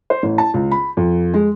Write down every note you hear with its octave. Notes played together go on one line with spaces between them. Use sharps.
C5
A1
A5
C#2
B5
F2
G#3